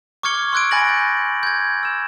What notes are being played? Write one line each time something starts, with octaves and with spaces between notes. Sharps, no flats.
C#6 D6 F6 G#6 C#7 G7
C6 E6 F#6 G#6 D7
G#5 B5 F#6 A6 A#6 F#7
G6
G6 G#6
E6 E7